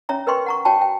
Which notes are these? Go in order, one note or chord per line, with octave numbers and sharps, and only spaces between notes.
C#4 C#5 E5 A#5
A#4 B4 D#5 G5 C6 C#6
F#5 A#5 C#6
F#4 C#5 G5 A5 B5
G5